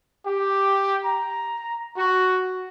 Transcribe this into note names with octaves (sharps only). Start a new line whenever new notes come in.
G4
A#5
F#4